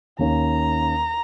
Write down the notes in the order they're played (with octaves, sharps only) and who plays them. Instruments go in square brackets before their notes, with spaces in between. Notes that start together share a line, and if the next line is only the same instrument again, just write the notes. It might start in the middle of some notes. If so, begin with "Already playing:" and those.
[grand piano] D#2 D#3 A#3 C#4 [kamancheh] A#5